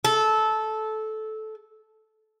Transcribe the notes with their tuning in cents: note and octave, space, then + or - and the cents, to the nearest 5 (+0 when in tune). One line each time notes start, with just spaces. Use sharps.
A4 -15